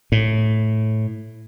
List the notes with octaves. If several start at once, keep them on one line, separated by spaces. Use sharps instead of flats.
A2